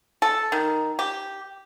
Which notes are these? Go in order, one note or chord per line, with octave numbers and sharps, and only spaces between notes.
A4
D#3
G4